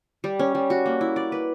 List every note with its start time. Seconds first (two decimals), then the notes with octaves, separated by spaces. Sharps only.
0.24 G3
0.39 C#4
0.55 G3
0.70 F#4
0.86 A#3
1.01 E4
1.16 D5
1.32 B4